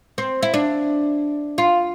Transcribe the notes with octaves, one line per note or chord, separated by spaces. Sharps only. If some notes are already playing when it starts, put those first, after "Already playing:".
C4
E4
D4
F4